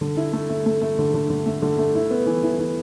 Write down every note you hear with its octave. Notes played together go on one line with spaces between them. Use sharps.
D3
E4
A3
A3
A3
A3
D3
D3
D3
A3
D3
A3
E4
B3
E3
E3
E3